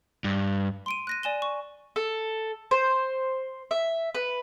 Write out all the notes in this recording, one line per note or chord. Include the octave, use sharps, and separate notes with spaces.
G2
C6 D7 D#7
F#6 A#6 D#7
D5 G#5 E7 G7
C#6
A4
C5
E5
B4